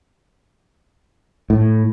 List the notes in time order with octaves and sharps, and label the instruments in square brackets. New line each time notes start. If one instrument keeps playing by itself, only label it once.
[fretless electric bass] A2